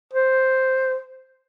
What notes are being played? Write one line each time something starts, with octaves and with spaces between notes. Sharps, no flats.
C5